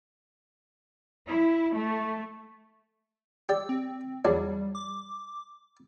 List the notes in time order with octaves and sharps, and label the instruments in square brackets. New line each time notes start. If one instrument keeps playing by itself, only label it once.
[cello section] E4
A3
[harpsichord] G4 D5 [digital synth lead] E6
[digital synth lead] C4
[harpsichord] E2 F#3 D4 [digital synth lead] G3
[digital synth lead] D6